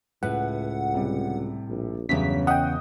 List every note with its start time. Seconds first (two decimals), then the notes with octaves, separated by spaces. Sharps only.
0.23 C#2 A2 B4 F#5
0.95 C3 G3
1.68 A#1
2.09 E2 G2 C#3 F#3 C#4 B6
2.47 D#5 F#5 G5 D#6